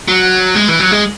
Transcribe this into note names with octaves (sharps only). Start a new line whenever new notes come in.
F#3
G#3
E3
F#3
G#3